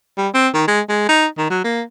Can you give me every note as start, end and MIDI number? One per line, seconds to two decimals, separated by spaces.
0.17 0.29 55
0.34 0.48 60
0.54 0.66 51
0.68 0.81 56
0.89 1.07 56
1.08 1.26 63
1.38 1.46 51
1.50 1.61 54
1.64 1.82 58